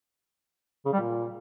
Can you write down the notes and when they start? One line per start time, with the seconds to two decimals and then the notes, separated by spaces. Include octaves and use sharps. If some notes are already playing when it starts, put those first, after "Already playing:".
0.86 C#3
0.93 G3
1.00 A#2